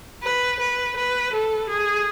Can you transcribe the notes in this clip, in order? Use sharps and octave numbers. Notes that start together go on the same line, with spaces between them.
B4
B4
B4
A4
G#4